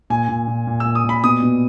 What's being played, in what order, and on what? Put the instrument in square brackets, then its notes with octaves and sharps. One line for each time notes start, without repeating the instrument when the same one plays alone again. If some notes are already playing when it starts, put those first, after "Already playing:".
[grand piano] A#2 G#5
A#2
A#2
A#2
A#2 E6
D#6
A#2 B5
B2 D#6
B2